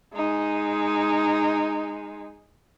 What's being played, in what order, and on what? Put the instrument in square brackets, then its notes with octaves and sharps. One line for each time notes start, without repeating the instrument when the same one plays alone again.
[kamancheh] G#3 D#4